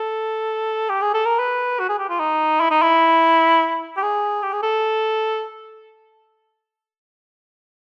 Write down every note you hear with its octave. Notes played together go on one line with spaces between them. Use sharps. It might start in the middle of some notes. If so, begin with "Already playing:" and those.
Already playing: A4
G4
G#4
A4
A#4
B4
F#4
G#4
G4
F4
D#4
E4
D#4
E4
G4
G#4
G4
G#4
A4